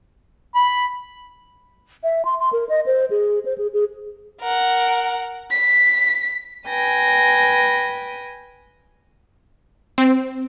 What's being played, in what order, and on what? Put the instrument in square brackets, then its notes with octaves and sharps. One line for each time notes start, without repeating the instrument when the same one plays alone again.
[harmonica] B5
[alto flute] E5
C6
C6
A#4
D#5
C5
G#4
C5
G#4
G#4
[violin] A#4 F#5
B6
[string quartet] B4 G5 G#5 A#6
[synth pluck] C4